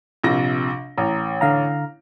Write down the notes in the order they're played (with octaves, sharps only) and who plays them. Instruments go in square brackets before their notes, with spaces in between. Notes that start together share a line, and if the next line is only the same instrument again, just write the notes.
[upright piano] A#1 C3 A#6
[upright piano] A1 [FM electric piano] A#5
[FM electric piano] D3 F5 A#5